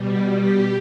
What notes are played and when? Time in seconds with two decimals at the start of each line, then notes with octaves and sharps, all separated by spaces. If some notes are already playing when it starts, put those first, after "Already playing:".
Already playing: B2 G3
0.08 G4
0.38 G4